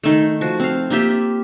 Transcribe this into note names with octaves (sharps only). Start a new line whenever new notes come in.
D#3 A3
F3 F#4
C4 F5
A#3 F4 G4 E5